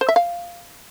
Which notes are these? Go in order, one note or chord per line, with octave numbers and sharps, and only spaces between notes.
C5
E5
F5